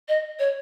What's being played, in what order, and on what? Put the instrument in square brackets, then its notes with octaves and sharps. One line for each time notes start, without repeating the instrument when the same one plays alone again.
[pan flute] D#5
C#5